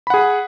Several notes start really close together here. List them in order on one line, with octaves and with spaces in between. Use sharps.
B5 F#5 G#4